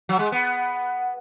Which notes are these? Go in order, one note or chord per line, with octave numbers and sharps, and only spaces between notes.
F#3
G#3
B3